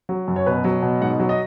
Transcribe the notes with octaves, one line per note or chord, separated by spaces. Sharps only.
F#3
F#2
C#5
B2 B4
F#3
B2
G#2 F#5
F#3
D#5